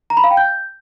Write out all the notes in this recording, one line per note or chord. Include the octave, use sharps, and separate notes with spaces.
A#5
B5
F5
G5
G6